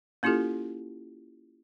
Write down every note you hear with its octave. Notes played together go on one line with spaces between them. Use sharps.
A#3 C#4 E4 F4 G4 A4